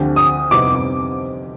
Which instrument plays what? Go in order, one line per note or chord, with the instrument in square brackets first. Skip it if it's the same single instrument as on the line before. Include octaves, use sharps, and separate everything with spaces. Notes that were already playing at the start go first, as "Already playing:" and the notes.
Already playing: [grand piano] D2 D3 F3 C4 G4
[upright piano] D#6
[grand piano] F2 C3 G3 B3 D#4 [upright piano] D6
[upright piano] D6